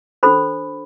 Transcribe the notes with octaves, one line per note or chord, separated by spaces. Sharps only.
D4 F#4 A4 C5 B5